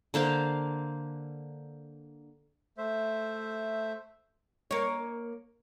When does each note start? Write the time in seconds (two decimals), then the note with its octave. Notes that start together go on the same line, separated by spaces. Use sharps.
0.14 D3 A#3 C5 F5
2.78 A3 C5 E5
4.71 A#3 C#5